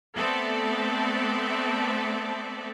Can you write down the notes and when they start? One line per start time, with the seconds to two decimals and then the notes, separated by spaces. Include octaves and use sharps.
0.15 A3 B3 C4 A4 D5 E5